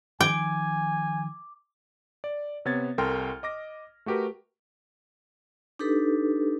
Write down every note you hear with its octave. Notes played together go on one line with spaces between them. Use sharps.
D#3 F3 G5 G#5 D6
D5
C3 B3 C#5 G#6 A6
C2 A4 A#4 G5 C6 F6
D#5 D6 A#6
A3 F#4 G4 A#4 B4
D4 D#4 G4 A4 B4